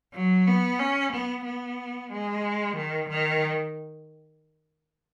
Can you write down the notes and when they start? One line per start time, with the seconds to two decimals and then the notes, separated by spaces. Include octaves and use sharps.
0.14 F#3
0.47 B3
0.79 C#4
1.12 B3
1.45 B3
2.11 G#3
2.76 D#3
3.09 D#3